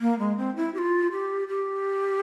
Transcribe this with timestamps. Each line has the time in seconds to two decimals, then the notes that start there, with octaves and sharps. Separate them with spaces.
0.01 A#3
0.19 G#3
0.37 C4
0.56 E4
0.74 G4
0.78 F4
1.12 G4
1.48 G4